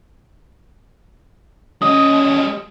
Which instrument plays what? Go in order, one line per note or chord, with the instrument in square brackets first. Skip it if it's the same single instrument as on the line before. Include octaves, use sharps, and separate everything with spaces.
[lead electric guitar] G3 D#5 [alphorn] C#4 [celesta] D#6